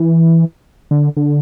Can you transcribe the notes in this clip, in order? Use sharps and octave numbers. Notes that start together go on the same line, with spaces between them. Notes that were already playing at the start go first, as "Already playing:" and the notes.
Already playing: E3
D3
D3